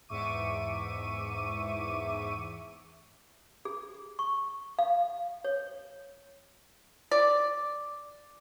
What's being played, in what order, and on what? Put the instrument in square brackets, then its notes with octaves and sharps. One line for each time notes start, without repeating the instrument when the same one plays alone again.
[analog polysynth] E2 G#2 E5 C#6 D6 D#7
[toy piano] G#4
C#6
F5
C#5
[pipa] D5